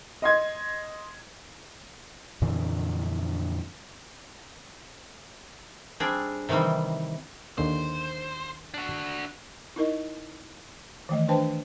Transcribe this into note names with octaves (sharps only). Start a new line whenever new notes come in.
D#5 C6 G#6
F2 A#2 D3 E3
G3 C4 D4 G#4
C3 D#3 E3 G3 C4
D#2 D3 A#3 C5
D4 F#4
D#4 E4 A#4 D#5
D#3 E3 A3 D#5
D4 B4 C5 G5 A5